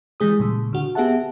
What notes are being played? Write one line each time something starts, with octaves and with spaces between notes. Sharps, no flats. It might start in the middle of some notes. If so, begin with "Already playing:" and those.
E3 G3 G#3 G#4 D#6
A#2 C#3
D3 F#4
B3 G4 G#4 E5 F#5 A5